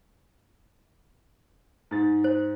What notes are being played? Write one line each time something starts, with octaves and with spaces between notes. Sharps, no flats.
G#2 A6
C5